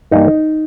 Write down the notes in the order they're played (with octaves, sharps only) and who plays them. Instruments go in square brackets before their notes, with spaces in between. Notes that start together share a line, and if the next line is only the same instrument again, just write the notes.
[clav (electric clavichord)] G2 E3 G3 A#3 D#4